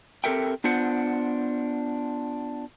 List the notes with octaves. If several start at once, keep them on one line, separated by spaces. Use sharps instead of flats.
C4 G4 A4 A#4 E5 G5
B3 D4 F4 C5 F#5